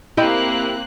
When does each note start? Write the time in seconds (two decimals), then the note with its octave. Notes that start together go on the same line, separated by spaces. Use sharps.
0.17 A#3 C4 E4 G4 D#5 F#6